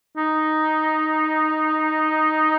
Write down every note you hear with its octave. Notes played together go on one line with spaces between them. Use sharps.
D#4